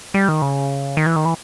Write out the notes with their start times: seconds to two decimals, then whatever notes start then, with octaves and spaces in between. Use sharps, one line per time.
0.14 G3
0.29 D#3
0.42 C#3
0.97 D#3
1.06 E3
1.16 D#3
1.25 E3